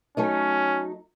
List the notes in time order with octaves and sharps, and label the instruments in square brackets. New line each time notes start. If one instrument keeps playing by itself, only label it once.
[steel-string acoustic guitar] F#3 A3 D#4 [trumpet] C#4